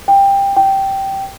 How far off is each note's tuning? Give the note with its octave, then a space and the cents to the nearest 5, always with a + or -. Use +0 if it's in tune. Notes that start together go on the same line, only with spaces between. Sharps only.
G5 +15
G5 -10